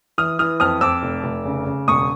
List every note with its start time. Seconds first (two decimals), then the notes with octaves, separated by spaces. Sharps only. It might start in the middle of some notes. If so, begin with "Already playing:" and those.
0.18 E3 D#6 F6
0.39 E3 D#6 F6
0.60 F2 D#6 F6
0.81 F2 D6 E6
1.03 F1
1.24 F1
1.45 C#3
1.66 C#3
1.88 E1 C#6 D#6